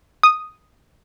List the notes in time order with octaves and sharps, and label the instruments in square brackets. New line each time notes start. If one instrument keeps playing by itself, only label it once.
[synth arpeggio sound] D#6